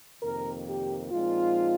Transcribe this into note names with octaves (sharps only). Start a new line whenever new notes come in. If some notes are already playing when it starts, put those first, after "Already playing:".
F2 C3 D#3 A#3 A#4
G4
A#2 F3 G#3 C4 D#4 F4